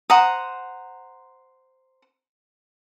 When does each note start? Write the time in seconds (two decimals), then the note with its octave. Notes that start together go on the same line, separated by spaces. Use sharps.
0.10 C5 F#5 A#5 D#6